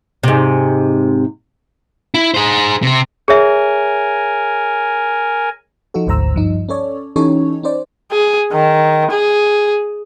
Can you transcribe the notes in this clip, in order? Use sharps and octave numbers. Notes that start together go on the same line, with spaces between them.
G#2 C3
E4
G#4 C5
C3 C4
G#4 A#4 C#5 E5 G#5
F3 D#4 F4 F#4 A4
G#1 D2 G#2 C5 A#5 E6
G2 F3 D#4
C#4 A4 C#5 D5
E3 C#4 D#4 G4 A4 C#5
C#4 D#4 C5 D5
G#4
D#3
G#4